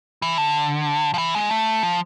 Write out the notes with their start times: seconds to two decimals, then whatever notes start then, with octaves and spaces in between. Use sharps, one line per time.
0.22 E3
0.38 D3
1.14 F3
1.18 E3
1.35 G#3
1.51 A3
1.83 F3